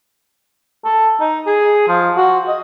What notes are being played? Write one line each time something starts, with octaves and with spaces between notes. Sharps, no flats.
A4
D#4
G#4
F3
F#4
D#5